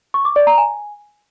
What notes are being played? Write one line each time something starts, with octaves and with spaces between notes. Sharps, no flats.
C#6
D6
D5
A#5
G#5